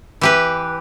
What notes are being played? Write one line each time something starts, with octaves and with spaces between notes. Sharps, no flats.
E3 G4 B4